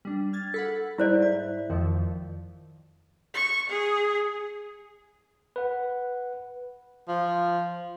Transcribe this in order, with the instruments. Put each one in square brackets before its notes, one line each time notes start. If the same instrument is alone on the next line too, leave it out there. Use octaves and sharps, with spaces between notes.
[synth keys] G3 D4
F6 G#6 A6
[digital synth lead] A4 [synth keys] F#5 B5 B6
[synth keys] G#2 [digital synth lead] G3 [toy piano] E4 C5 D5
[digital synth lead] E5
[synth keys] G#1 F2 F3 [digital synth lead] D#3
[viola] C#6
G#4
[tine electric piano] B4 F#5
[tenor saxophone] F3